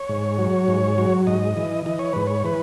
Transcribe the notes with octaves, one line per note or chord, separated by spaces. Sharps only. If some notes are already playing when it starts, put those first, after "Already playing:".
Already playing: C#5
G#2
F#3
G#2
F#3
G#2 D#5
E3
E3 D#5
C#5
G#2 B4
C#5
E3 B4